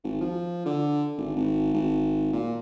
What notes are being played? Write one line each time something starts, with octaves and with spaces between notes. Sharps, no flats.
G#1
F3
D3
G#1
G#1
G#1
A#2